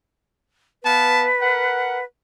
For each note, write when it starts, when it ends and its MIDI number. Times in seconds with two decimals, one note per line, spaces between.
0.83 1.29 59
0.83 2.04 71
0.83 1.29 77
0.83 1.29 81
1.40 1.99 70
1.40 1.99 78